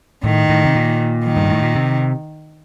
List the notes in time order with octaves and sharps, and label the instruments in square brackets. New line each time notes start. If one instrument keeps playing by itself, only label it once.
[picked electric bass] A2 [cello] D#3
[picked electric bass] A2
C3
A#2
[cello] D#3
[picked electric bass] G2
A2
A#2
C3